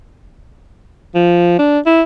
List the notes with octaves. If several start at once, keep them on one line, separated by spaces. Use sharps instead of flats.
F3
D4
E4